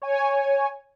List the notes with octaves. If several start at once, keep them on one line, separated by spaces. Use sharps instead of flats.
C#5 G#5